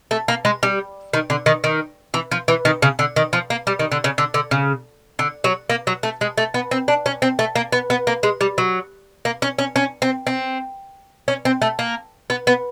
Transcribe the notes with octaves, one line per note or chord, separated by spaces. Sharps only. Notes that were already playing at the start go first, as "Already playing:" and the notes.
A3
A#3
G#3
G3
D#3
D3
D#3
D#3
E3
F3
E3
D#3
C#3
D3
D#3
F3
A#3
G3
D#3
D3
C#3
D3
D3
C#3
D3
F#3
A#3
F#3
A3
G#3
A3
B3
C4
D4
C#4
C4
A3
A#3
B3
B3
A#3
G#3
G3
F#3
A#3
C#4
C#4
C#4
C4
C4
C#4
C4
A3
A#3
B3
B3